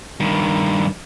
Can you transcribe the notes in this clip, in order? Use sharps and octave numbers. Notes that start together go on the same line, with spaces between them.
G2 D#3